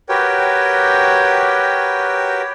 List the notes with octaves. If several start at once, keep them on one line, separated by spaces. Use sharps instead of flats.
F#4 G4 A#4 B4 C#5 G5